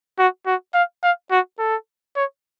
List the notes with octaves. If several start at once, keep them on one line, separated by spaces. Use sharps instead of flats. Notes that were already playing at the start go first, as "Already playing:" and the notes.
F#4
F#4
F5
F5
F#4
A4
C#5